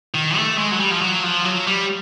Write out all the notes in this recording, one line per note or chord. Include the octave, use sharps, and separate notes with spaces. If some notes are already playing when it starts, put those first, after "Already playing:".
D#3
A3
G#3
F#3
G3
F3
F#3
F3
F#3
G3